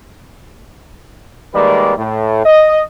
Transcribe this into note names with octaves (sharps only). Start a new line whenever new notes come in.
D#3 G3 G#3 A#3 B4 D5
A2
D#5